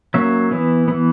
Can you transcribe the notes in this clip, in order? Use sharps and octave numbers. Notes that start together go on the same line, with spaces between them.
F#3 A#3 C#4 E5
E3 B3
E3 B3